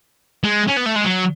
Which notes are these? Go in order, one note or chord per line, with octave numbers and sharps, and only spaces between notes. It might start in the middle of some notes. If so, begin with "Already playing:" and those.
G#3
C#4
B3
A3
G#3
F#3